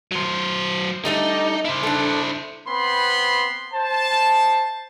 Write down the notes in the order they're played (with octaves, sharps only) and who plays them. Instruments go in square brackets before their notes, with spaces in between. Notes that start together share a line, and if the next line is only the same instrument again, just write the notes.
[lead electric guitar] F#3 C5
[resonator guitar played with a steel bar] G3 A3 D4 [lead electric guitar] D#4
[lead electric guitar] E4 C5
[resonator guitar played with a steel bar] D4 A4
[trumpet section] B3 C4 B5 C6
C5 A5